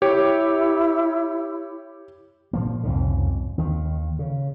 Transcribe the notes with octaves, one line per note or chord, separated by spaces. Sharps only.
E4 G4 C#5
A#2 F3 A#3
C2 F2 G#2 C#3
D#2 D#3
C#3